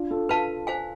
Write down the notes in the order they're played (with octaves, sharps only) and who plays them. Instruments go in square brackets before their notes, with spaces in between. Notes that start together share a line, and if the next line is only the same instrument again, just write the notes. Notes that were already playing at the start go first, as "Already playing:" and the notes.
Already playing: [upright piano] D4 F4
F4 A4
[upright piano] F4 A4 [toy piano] B4 F5 A5
[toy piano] C5 F5 G#5